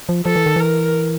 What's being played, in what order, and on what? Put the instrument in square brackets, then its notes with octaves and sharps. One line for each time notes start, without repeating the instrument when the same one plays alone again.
[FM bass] F3
[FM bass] F3 [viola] A4
[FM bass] E3
D#3
[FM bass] E3 [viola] A#4